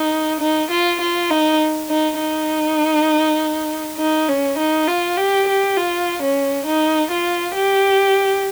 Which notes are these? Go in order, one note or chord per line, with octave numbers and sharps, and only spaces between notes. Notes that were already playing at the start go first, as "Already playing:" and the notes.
Already playing: D#4
D#4
F4
F4
D#4
D#4
D#4
D#4
C#4
D#4
F4
G4
G4
F4
C#4
D#4
F4
G4